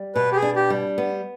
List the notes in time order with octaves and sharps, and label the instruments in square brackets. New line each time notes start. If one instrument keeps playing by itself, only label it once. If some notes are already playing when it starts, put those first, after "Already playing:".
Already playing: [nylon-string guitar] G3
[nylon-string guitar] B2 [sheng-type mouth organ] B4
[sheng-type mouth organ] G4
G#4
[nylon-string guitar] D4
[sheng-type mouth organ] G4
[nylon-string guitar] G3
B3